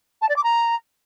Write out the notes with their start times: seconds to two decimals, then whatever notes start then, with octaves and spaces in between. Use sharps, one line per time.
0.21 A5
0.29 D5
0.36 D6
0.44 A#5